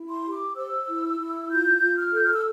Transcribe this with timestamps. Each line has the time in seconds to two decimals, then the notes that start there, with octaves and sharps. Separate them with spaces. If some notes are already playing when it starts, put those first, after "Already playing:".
Already playing: E4
0.09 C6
0.25 G4
0.32 D6
0.56 C5 E6
0.87 E4
1.18 E4
1.50 F4 G6
1.80 F4
1.97 F6
2.12 A4 G6
2.24 F6
2.33 E6